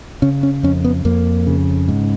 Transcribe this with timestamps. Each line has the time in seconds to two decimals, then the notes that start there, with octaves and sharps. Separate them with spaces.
0.22 C#3 C#4
0.43 C#4
0.63 F2 C#4
0.84 B3
1.05 F2 A#3
1.47 C#3
1.88 G#2